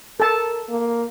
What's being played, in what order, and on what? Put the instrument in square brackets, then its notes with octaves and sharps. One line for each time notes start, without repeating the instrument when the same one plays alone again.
[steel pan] A4 A5 [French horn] A#4
[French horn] A#3